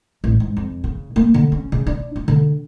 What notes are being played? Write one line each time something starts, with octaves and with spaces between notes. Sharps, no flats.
A1
G#2
F2
C#3
A#3
D3
C#4
C#3
D4
F4
D3